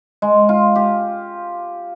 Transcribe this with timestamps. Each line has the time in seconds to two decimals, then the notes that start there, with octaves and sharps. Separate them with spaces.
0.22 G#3
0.49 F4
0.76 G4